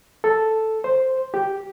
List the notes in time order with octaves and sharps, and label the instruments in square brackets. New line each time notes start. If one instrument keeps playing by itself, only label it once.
[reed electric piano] A4
C5
G4